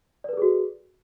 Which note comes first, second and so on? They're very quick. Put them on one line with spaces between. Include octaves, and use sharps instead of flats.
D5 B4 A4 G#4 F#4